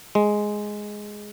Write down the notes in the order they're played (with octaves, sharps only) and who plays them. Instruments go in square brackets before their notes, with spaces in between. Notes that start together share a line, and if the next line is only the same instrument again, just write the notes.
[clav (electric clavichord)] G#3